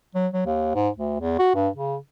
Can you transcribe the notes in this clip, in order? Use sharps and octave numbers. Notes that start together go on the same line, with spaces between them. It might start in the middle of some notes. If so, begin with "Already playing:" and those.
F#3
F#3
D#2
G#2
D2
E2
F#4
G2
C#3